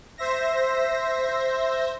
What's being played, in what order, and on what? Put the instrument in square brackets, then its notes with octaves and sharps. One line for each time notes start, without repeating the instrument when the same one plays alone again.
[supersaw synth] C5 E5 A#6